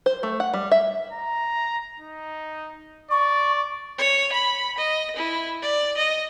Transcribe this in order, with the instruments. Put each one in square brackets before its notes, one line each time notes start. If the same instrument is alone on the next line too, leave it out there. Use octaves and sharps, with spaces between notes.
[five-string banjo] C5
A3
F#5
G3
E5
[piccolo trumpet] A#5
D#4
[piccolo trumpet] D5 [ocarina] C#6
[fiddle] C#5
B5
D#5
E4
D5
D#5